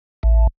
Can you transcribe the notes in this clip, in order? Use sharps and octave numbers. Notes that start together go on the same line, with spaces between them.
A1